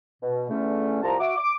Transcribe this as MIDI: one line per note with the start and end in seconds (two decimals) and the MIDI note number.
0.23 0.46 47
0.50 1.01 40
0.50 1.01 50
0.50 1.01 57
0.50 1.01 61
1.03 1.15 36
1.03 1.15 53
1.03 1.15 81
1.03 1.15 82
1.20 1.34 66
1.20 1.34 76
1.20 1.34 86
1.37 1.56 86